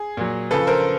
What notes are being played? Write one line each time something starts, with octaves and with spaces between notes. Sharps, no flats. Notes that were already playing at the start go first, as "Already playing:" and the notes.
Already playing: G#4
A#2 F#3
C#3 F3 A4 B4
A#4 C5